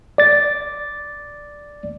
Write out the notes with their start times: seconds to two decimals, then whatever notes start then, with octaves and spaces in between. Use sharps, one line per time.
0.18 D5 A6